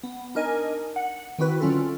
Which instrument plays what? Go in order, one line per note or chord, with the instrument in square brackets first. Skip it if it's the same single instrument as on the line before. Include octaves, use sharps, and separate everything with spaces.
[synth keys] B3
D4 D#4 A#4 D#5 G#5
F#5
D#3 C4 E4 F#4 B4
D3 F#3 C#4 F4 A4